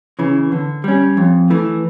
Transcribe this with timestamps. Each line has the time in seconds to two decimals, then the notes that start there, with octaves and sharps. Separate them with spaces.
0.19 C#3 E3
0.52 D3
0.84 G3 C#4
1.17 F2
1.50 E3 A3